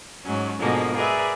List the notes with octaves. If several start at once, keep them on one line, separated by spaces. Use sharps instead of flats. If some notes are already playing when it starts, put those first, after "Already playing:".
G#2 F#3 C#4
G#2 B2 D3 F3 G#3 A#3
G#4 A#4 B4 D5 E5